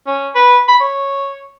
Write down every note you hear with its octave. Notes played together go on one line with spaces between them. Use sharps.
C#4
B4
B5
C#5